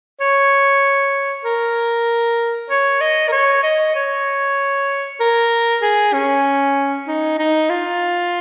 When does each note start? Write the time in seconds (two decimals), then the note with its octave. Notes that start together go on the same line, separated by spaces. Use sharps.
0.21 C#5
1.45 A#4
2.70 C#5
3.01 D#5
3.28 A#4
3.32 C#5
3.63 D#5
3.95 C#5
5.20 A#4
5.82 G#4
6.13 C#4
7.07 D#4
7.38 D#4
7.70 F4